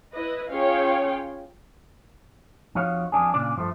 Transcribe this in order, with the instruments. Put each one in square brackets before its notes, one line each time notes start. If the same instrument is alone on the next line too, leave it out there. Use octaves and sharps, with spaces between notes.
[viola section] E4 B4 D#5
C#4 F4 G#4 C#5 F5 G5
[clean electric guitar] F2 F3 D#4 F#4 C#5 F5
F2 G#2 D4 G#4
A#2 C#3 D4 D5
G2 F3 G#3 A3